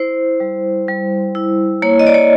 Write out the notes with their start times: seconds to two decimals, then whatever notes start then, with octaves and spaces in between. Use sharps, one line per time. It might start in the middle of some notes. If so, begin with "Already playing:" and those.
Already playing: E4 C5
0.40 G3
0.88 G3
1.35 E4
1.82 A#3 C#5
1.99 D#5
2.07 D5
2.14 C#5